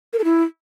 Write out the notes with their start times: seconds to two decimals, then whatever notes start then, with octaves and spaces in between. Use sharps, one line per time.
0.13 A#4
0.19 A4
0.24 E4